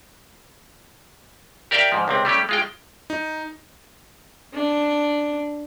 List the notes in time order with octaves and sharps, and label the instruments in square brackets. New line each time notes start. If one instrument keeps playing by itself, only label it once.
[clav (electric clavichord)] G4 A#4 D5 E5 F5 G5
G#2 F3
C#2 C3 C4
G3 A3 C#4 G4
G#3 F4 G5
[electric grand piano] D#4
[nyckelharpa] D4